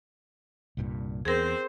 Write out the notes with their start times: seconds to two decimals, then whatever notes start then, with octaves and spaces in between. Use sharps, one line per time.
0.77 C2 G2 A#2
1.25 E2 C4 G#4 A#4 C5